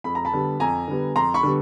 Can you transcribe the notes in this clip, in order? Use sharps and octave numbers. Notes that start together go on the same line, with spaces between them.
F2 B5
A#5
A5 B5
D3 G3 B3
F2 G#5 A#5
D3 G3 B3
F2 A#5 C6
B5 C#6
D3 G3 B3